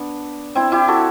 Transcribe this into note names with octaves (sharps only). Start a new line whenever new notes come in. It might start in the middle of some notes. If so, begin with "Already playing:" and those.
Already playing: B3 D4
C4 E4
E4 G4
F#4 A4